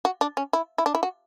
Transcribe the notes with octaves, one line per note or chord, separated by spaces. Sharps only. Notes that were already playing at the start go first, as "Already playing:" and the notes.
F#4
D4
C#4
E4
E4
D4
E4
F#4